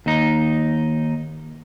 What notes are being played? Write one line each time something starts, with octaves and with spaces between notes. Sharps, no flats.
D#2 D#4